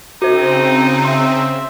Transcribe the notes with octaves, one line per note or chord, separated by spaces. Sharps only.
C#3 C4 D#4 F#4 C5
E5 C6